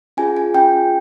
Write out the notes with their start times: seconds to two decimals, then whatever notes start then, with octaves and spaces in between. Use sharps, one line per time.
0.17 C#4 F4 G#4 G#5
0.37 G#5
0.54 C#4 F4 G#4 G5